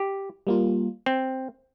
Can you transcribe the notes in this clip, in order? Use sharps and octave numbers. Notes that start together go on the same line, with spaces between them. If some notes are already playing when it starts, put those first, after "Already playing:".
Already playing: G4
G3 A#3 F4
C4